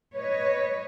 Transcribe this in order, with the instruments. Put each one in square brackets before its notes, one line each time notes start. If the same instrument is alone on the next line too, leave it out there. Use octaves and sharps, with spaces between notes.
[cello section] B4 C#5 D#5